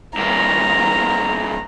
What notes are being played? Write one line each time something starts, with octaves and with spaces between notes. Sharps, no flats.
G2 A#3 A#5